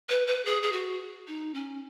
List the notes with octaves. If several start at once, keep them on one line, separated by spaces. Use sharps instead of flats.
B4
B4
G#4
G#4
F#4
D#4
C#4